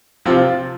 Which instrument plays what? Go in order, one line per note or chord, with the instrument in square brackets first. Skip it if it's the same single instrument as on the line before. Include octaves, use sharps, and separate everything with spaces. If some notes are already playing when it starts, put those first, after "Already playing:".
[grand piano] C3 F3 C4 F4